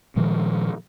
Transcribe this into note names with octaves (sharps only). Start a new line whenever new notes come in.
A#2 D#3 F3 G#3